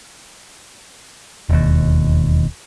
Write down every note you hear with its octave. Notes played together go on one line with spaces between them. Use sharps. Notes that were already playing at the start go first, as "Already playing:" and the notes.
E1 D#2